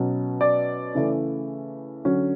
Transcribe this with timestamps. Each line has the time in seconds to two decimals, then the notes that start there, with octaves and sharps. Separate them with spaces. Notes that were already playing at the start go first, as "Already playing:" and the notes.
Already playing: B2 F#3 C#4
0.41 D5
0.95 C#3 E3 A3
2.05 D3 F#3 C#4